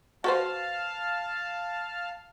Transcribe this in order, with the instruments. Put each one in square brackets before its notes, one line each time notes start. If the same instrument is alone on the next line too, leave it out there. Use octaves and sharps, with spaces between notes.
[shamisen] F#4 B4 C5 [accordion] F5 A5 F6